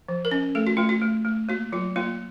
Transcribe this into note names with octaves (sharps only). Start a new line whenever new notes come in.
F3
A#4
C#4
A3 A4
F#4
A3 F4
F#4
A3
A3
A#3 F#4
F#3 F4
A#3 F4